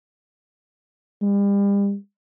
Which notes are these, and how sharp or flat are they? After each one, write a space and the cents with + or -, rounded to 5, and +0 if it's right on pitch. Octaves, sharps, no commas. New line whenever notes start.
G3 +40